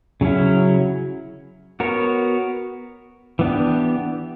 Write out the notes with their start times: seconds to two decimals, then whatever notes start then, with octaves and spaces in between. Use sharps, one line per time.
0.21 C#3 F#3 C#4 E4
1.80 B3 F#4 A#4 C#5
3.39 E3 B3 D4 G4